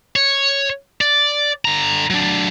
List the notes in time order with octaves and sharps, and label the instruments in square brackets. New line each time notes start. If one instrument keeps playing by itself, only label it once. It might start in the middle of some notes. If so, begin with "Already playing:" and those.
[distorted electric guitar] C#5
D5
D3 A#5
F#3 D4